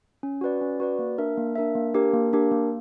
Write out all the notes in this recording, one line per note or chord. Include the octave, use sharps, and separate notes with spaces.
C#4
F#4 B4 D5
C#4
F#4 B4 D5
A#3
D4 A#4 E5
A#3
D4 A#4 E5
A#3
D4 G4 A#4
A#3
D4 G4 A#4
A#3